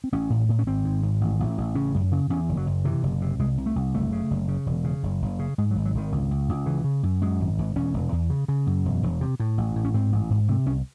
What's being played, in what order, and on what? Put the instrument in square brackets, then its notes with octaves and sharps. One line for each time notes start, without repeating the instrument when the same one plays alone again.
[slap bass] C4
A1 C#4
A2
A2
C#4
G#1 C4
G#2
G#1
A1
A1
A1
C#3 C#4
F#2
C#3
E2 C#4
F#1
F#3
F#1
C3 E3
F#1
C3
C2 G#3
C2
A3
C2
F#1 A3
C#3
F#1
C#3
E1
C#3
F#1
F#1
C#3
G#2 G#3
F#3
G#1
F#3
G#1 D#3
C#2
C#2
C#2
C#3 E3
C#3
F#2
F#2 G#3
G#1
G#1
E1 C#4
E1
E2
C#3
C#3
F#2
E1
E1
C3
A2
A1
A2
C#4
G#2 C4
A1
G#2
C3 A3
C2 C#4